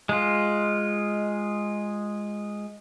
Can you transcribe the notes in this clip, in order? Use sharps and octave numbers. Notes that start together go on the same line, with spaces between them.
G#3 F4